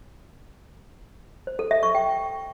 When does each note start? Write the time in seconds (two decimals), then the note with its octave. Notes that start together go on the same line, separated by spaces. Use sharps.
1.47 C5
1.59 A4
1.71 E5
1.83 C#6
1.95 G5